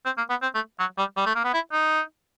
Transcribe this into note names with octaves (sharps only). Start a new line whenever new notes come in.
C4
A#3
B3
C4
A3
F#3
G3
G3
A3
A#3
B3
E4
D#4